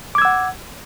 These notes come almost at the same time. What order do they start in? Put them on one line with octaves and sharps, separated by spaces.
D6 G#6 E6 F#5